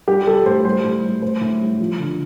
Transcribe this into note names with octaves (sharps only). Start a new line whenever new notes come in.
G3 G4
G3 A4
A2 C5
G3 C5
A2
G3
A2 C5
A2
G3
F3
D3